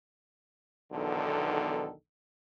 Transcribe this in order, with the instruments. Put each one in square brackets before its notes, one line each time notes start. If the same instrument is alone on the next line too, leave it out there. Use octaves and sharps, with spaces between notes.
[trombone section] B1 E2 D3 D#3 A4